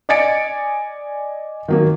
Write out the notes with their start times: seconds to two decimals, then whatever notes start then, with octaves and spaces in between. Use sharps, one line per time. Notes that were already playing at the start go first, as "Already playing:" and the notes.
0.09 D5 D#5 G#5 A6 C#7 D7
1.68 D#3 F#3 A#3